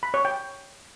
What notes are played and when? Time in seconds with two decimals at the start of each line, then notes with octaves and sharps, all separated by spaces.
0.03 B5
0.14 C#5
0.25 G5